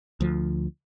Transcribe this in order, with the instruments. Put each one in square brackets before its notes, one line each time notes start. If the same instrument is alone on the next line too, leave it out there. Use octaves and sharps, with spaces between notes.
[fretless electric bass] D2 F3